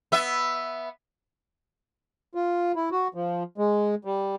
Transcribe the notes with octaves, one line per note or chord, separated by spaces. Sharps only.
B3 E5
F4
E4
F#4
F3
G#3
G3